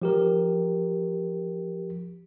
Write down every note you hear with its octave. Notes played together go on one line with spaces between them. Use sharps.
F3 G4 A#4